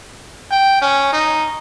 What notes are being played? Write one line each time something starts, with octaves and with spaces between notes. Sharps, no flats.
G5
C#4
D#4